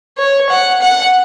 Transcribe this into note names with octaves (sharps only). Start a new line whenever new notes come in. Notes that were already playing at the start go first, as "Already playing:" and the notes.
C#5
F#5
F#5